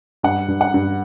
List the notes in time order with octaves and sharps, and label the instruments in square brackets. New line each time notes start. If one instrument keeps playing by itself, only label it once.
[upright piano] G2 F#5
G2
F#5
G2